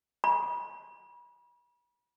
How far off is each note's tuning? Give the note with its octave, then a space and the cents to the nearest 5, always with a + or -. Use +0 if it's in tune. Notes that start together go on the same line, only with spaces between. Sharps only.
B5 -40